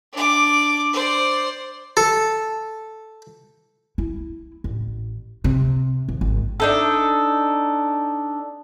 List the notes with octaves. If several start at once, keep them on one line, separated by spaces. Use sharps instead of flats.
D4 D6
C5 D5
A4
E4
A1
C3
D#2
G#1
D4 D#4 A4